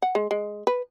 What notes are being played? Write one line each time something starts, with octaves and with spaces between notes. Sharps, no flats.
F#5
G#3
G#3
B4